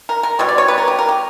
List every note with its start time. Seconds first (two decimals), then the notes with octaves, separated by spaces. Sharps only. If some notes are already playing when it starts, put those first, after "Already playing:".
0.09 A#4
0.23 A#4
0.39 B2 G3 C#5
0.48 D5
0.58 C#5
0.68 B4
0.78 A#4
0.88 G4
0.98 A#4
1.09 G4